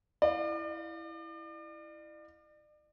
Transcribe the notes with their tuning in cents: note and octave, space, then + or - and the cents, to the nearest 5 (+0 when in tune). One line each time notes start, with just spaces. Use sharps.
E4 +0 D5 +40 F5 +10